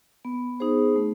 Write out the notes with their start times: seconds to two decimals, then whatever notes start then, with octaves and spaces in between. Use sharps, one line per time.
0.25 B3
0.60 D#4 G#4 C5
0.96 A3